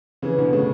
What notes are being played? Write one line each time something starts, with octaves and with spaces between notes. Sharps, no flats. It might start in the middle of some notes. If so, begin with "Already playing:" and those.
C#3 E3
B2 D3
A2 C#3